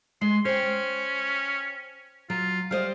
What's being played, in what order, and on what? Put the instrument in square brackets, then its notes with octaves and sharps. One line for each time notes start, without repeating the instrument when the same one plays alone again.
[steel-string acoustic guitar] G#3 [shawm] C6
[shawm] C#4 [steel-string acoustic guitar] C5 G5
[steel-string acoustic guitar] F#3 [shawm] F4
[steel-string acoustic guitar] G3 C5 D#5 [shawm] F5